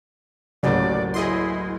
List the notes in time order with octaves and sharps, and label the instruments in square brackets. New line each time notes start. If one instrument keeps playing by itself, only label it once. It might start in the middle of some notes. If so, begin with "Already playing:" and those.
[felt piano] A1 D2 A#3 [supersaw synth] C#3 [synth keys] F#3 [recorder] D5
[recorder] E4 [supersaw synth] G#4 D#5 C6